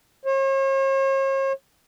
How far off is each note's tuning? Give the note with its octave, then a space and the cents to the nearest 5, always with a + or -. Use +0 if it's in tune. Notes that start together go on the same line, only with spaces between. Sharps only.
C#5 -45